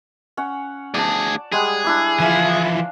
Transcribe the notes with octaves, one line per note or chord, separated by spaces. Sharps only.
C#4 F#5
D2 G#4 D5 A5
G3 G#3 G#4 F#5
D4 E4 D6
E3 F3 E4 F5 G#5